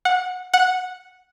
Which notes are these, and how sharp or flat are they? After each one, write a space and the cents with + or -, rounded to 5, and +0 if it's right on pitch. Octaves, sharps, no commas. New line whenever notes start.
F#5 -20
F#5 -10